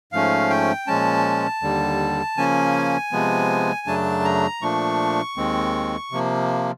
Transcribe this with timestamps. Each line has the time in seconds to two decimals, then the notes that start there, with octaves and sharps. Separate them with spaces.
0.12 G#2 F3 A3 C#4 F5
0.50 G5
0.87 A#2 F3 G#3 C#4 A5
1.62 D#2 D3 G3
2.37 C#3 F3 A#3 C#4 G#5
3.12 C3 F3 G#3 B3
3.87 F#2 C#3 F#3 A3 D4 A5
4.25 A#5
4.62 A#2 F3 A3 D4 C#6
5.37 D#2 D#3 G#3 C4
6.12 C3 F3 A#3